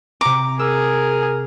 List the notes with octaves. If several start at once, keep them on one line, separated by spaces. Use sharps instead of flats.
C3 A#5 D6
G#4 A#4 E6